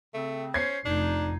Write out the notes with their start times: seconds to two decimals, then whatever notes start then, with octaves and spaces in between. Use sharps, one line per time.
0.14 C#3 A3 C4
0.54 C#4 C5 G#6 C7
0.85 F1 D4 D#4